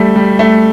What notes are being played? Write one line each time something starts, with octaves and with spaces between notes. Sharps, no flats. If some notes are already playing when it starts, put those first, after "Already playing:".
Already playing: G3 A3
G3
A3